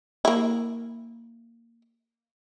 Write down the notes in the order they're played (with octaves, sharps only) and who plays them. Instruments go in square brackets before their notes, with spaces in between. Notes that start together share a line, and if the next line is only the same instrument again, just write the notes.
[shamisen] A#3 E4